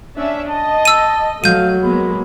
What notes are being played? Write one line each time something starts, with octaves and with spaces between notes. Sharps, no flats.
C#4 D4 E5
D#5 A5
E6 D#7
F#3 A3 F5 G6 D#7
G#3 A#3 B3 B5